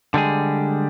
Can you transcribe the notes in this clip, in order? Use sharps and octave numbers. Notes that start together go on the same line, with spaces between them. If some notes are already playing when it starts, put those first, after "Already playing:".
D3 G3 G#3 G#4